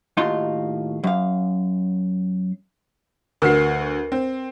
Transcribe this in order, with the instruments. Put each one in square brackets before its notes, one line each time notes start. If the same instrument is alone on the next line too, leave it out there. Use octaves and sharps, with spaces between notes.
[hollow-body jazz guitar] D#2 A2 D#4 F4 F#4 C6
F#2 F5
[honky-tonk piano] D2 F#4 C7 [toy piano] A#4 B4
[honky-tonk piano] C4